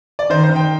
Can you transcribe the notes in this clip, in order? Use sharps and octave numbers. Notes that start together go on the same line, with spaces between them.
D5
D#3 C5
C5
D#3
G5